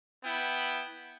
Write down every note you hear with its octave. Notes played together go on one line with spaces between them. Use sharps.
B3 E4 G5